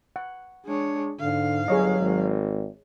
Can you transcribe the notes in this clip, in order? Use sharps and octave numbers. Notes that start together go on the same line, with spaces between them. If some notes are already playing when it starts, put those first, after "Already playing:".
F#5
G#3 D4 C#5
G#2 D3 F5
G1 F#3 G#4 C#5 D#5
G#1